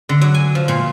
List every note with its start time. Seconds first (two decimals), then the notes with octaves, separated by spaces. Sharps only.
0.09 D3
0.21 F#3
0.34 G#5
0.55 F3
0.68 A#2